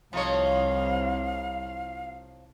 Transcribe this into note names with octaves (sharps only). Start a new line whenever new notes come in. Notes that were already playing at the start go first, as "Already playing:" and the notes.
C2 F3 D#4 C#5 F5